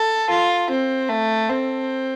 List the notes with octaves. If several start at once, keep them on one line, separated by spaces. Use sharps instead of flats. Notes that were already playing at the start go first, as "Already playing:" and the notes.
Already playing: A4
F4
C4
A3
C4